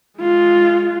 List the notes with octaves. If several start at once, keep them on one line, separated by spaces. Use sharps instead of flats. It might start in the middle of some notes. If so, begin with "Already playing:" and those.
G#3 F4